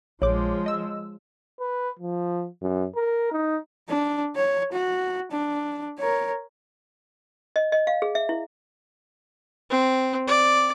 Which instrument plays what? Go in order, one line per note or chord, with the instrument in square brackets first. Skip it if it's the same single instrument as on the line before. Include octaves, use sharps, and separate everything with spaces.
[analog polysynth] A#1 D6 [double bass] F3 G#3 [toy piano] C#5
[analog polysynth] D#5 E6
[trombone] B4
F3
F#2
A#4
D#4
[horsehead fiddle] D4
C#5
F#4
D4
A#4 C#5
[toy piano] D#5
D#5
F5
G#4
E5
E4
[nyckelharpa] C4
D5